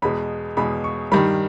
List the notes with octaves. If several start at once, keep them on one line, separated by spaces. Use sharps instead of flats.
E2 B2 G#3 B5
E2 B2 G#3 B5
C#6
G2 D#3 G3 B5